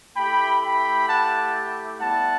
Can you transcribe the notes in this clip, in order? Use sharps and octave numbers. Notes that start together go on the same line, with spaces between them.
A3 E4 G4 G5 B5
G5 B5
F#5 A5
G3 B3 E4 G4 F#5 A5